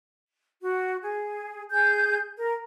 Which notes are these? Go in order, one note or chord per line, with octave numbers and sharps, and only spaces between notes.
F#4
G#4
G#4 G6
A#4